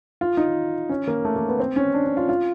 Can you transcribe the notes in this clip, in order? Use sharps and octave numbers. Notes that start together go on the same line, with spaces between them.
F4
D#4
C#4
A#3
A3
A#3
B3
C4
C#4
D4
D4
F4
F4